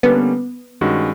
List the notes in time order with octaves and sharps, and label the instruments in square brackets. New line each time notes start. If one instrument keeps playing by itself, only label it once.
[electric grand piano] D3 G3 A#3 C#4 [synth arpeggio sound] B3
[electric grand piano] G2 D#3 G#3 C#4 F#4